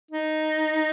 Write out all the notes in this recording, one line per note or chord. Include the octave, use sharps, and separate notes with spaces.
D#4